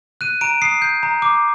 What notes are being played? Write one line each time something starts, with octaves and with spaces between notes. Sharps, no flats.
F#6 D#7
A#5 D7
D#6 C7
G6
A#5
D6